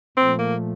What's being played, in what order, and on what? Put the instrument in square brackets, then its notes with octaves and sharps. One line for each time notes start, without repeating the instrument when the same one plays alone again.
[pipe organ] A#2 F3 A3 [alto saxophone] C4
[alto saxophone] A#3